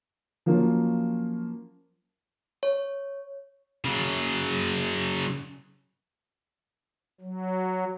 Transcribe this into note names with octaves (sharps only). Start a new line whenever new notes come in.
F3 F#3 A#3 C#4 F4
C#5
C#3 F#3
F#3